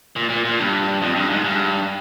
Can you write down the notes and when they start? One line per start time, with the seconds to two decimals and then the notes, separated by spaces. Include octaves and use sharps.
0.16 A#2
0.30 A#2
0.45 A#2
0.59 G2
1.02 F2
1.16 G2
1.30 G#2
1.44 G2